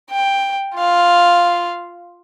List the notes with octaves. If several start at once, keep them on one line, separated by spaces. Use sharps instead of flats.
G5
F4 F5